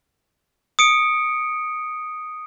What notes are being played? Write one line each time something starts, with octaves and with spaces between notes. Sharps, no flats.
D#6 C#7 D7